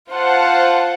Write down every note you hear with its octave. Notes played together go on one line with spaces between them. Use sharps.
F4 C5 F#5 A5